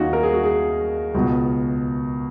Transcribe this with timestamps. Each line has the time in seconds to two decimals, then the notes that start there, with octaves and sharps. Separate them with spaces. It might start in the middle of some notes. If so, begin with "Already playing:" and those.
Already playing: D#2 D#3 C#4 D#4 F4 F#4
0.13 A#4
0.23 G#4
0.33 F#4
0.43 G#4
1.14 C#2 B2 F#4